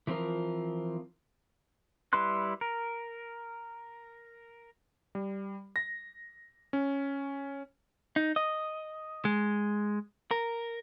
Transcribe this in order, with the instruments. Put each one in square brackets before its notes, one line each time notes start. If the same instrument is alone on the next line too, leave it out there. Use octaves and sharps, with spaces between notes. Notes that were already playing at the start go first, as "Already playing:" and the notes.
[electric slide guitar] E3 F3 C4 F4 A#4
[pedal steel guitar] G3 E4 B4 C6 F#6
A#4
[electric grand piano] G3
A#6
C#4
[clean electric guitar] D#4
D#5
G#3
A#4